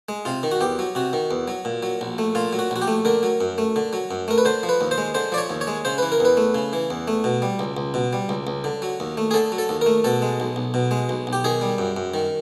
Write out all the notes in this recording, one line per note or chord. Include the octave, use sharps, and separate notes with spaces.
G#3
C3 F4
D#3
F#4
E2 G4
F#3
C3 F#4
D#3
E2
F#3
A#2
F#3
A#1
A3
A#2 F4
F#3
F#4
A#1 F#4
G4
A3
D3 A#4
F#3
F#2
A3
D3
F#3
F#2
A3 A#4
B4
D3 C5
F3
B4
D#2
C5
G#3
D3 C5
F3 D5
C#5
D#2
C#5
G#3
C#3 C5
E3 B4
A#4
E2 B4
A3
C#3
E3
E2
A3
B2
G3
C#2
C#2
B2
G3
C#2
C#2
D3
F#3
D#2
A3
G#4
D3 A4
F#3
A4
D#2
A3 A#4
B2 A4
G#3
B1
B1
B2
G#3
B1
B1
G4
D#3 G#4
G3
F#2
F#2
D#3